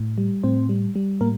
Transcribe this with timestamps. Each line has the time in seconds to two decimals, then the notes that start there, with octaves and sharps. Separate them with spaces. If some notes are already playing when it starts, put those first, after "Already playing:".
Already playing: A2
0.18 G3
0.44 A2 C4 C5
0.69 G3
0.95 G3
1.21 A2 A#3 A#4